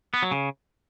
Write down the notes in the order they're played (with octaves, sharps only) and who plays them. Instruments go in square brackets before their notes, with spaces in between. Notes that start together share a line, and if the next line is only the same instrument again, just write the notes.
[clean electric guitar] B3
F#3
C#3